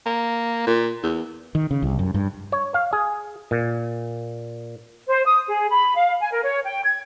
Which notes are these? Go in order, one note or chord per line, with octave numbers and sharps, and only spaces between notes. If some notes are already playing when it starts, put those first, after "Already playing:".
A#3
A#2
E2
D#3
C#3
C2
F#2
G2
C#5
F5
G#4
A#2
C5
D#6
G#4
B5
F5
G#5
A#4
C#5
G5
G#6